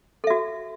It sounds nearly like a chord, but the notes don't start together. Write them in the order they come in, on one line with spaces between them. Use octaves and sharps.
A4 E5 F#4